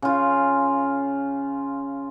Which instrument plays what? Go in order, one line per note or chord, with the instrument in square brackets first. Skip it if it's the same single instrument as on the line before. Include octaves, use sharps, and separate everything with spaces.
[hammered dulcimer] C#3 F4